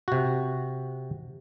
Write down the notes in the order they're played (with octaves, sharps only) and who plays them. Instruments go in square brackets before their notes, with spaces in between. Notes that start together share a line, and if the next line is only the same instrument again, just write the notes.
[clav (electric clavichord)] C3 F#4